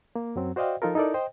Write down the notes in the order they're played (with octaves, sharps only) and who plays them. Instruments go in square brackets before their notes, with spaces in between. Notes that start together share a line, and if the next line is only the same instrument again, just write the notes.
[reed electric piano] A#3
F#2 F#3 C4
F#4 C5 D5 D#5 F5 G5
F3 D#4 F4 A4 A#4
D#4 E4 A4 A#4 D5
C5 D#5 G5